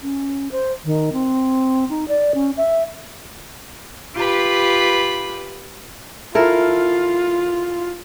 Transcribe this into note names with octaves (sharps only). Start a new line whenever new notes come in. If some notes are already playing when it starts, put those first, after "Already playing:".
C#4
C5
D#3
C4
D#4
D5
C#4
E5
F4 G4 B4 B5
E4 F4 A4 A#4